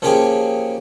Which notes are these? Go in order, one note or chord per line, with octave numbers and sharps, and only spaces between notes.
F3 A#3 C#4 G4 G#4 C#5